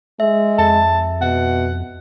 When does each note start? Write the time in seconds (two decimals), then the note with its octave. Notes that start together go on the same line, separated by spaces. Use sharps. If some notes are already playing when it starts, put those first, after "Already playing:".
0.20 G#3 E5
0.58 F2 A5
1.22 B2 F#5